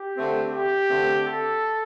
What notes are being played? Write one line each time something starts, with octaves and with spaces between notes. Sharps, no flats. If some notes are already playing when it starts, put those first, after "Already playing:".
Already playing: G4
D3 A3 C4
G4
D3 A3 C4
A4